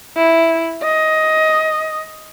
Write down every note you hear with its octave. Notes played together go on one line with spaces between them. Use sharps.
E4
D#5